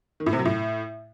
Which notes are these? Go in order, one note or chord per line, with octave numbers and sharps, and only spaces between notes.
D#3
A2
C3
F#3
A2